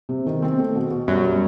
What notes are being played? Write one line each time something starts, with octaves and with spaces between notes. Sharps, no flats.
C3
D#3
C4
A3
B2
B2
F#2 F#3 G3
G3